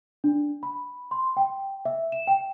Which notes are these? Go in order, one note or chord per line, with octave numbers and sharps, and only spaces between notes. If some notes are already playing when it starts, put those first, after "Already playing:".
D4
B5
C6
G5
E5
E7
G5